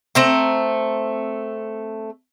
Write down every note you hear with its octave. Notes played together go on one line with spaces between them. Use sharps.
A3 C4 A#5